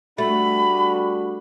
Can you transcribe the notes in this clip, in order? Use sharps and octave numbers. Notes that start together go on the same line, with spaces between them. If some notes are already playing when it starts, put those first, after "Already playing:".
G3 A3 D4 F#4 B5